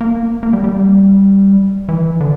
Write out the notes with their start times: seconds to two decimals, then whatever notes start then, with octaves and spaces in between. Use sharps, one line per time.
0.01 A#3
0.43 A#3
0.53 G3
0.64 G3
1.89 E3
2.20 D3